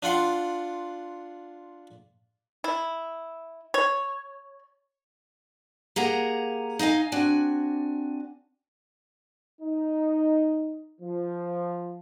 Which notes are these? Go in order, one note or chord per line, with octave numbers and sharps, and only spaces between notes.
D4 F4 F#5 C6
E4
C#5
A#3 G4 G#4 F#5 A#5
D#4 D#5 F5 G#5
C4 D4 F#4 G#5
D#4
F3